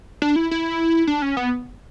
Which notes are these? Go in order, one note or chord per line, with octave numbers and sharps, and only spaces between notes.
D4
E4
E4
D4
C#4
B3